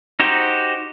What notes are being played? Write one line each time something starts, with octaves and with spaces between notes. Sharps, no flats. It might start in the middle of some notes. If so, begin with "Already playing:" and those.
D#4 F#4 G4 C5